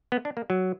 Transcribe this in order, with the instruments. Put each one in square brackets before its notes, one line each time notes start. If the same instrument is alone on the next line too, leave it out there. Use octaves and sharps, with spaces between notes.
[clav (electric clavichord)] B3
D4
A#3
F#3